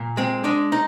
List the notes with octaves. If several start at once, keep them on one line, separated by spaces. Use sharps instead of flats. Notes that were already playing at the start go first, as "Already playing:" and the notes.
Already playing: A#2
G#3 C4
G#3 D4
D#4